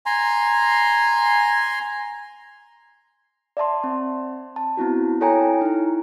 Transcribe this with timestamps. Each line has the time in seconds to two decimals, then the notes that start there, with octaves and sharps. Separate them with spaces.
0.06 G#5 A#5 C6
3.57 D5 E5 A5 C6
3.84 C4
4.56 A5
4.77 B3 C4 E4 F#4
5.21 E4 A4 C#5 G5 G#5 A#5
5.61 D#4 E4